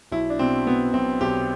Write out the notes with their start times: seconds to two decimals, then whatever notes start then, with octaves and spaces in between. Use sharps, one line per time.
0.12 B1 E4
0.30 D4
0.39 B2 C4
0.66 B2 B3
0.94 B1 C4
1.21 B1 G4